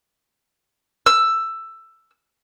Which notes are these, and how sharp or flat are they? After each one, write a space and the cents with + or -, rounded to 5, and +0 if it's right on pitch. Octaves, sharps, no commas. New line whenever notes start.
E6 +10